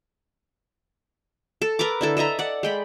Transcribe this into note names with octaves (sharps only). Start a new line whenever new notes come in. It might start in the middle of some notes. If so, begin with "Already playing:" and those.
A4
A#4 B4 A#5 D6
D3 E4 A4
A4 D#5 E5 A#5
D5 F#5
G#3 G5 B5